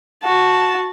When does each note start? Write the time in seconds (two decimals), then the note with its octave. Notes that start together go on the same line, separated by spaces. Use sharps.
0.23 F#4 A5